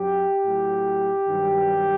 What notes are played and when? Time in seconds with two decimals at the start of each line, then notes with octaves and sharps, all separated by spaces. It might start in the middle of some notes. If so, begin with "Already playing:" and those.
Already playing: F#2 F#3 G4
0.44 A2 F#3
1.28 G2 D#3 F#3